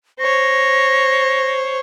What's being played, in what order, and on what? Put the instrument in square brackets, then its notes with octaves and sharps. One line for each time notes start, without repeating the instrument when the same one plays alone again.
[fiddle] C5 C#5 [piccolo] A#6